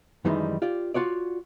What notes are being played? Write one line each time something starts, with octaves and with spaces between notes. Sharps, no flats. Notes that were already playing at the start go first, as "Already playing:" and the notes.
F#2 D#3 E3 G3 G#3 D#4
F4 G4 D5
F4 F#4 C#5 D5